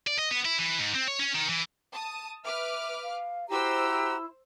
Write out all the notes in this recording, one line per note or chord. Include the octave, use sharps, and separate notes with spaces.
D5
D#5
B3
E4
E3
G#2
C4
C#5
C#4
D#3
E3
A5 D#6
B4 E5 D6 F6
F5
E4 F#4 G4 C5 A#5 E6